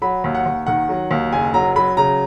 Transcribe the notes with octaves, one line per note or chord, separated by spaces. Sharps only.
F#3 B5
D#2
F#5
D#2
D#3 F#5
F#3
D#2
F#1 G#5
F#3 A#5
F#3 B5
C#3 A#5